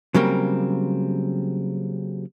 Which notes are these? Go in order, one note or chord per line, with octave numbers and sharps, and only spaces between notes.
C#3 F#3 G3 A#3 C4